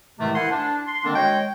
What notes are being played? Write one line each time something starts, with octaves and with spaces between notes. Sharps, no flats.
A2 C3 D#3 E3 G#3 A3
E4 A#4 C5 F#5 G#5 C6
D4
C6
D3 D#3 G#3 A#3 C4 D4
G#3 F#4 C#5 D#5 G5